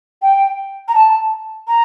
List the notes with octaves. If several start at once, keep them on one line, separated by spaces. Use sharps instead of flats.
G5
A#5
A5
A#5